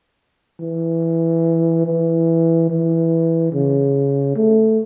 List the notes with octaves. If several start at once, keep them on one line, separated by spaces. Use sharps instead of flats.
E3
E3
E3
C#3
A3